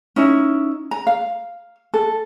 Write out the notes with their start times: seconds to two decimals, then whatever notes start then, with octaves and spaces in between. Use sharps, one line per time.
0.16 C#4 D#4 E4
0.91 A#5
1.07 F5
1.94 A4